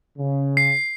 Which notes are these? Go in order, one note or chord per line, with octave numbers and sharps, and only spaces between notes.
C#3
C7